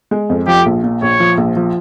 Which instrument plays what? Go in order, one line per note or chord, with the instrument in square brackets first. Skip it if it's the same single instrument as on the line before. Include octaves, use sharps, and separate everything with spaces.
[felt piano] G#3
F2
[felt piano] F3 [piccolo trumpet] G4
[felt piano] A#1
A#2
[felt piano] A#1 [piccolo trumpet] C#5
[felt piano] F3
A#1
F3